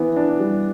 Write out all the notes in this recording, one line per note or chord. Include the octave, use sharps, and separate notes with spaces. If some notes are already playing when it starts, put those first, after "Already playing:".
Already playing: E3 B3
D4
G3